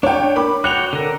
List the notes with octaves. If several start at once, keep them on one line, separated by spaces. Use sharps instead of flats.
D4 C#5 G5
A#3 B5 D6
F#4 C#5 G5 F#6 F7
D3 A#4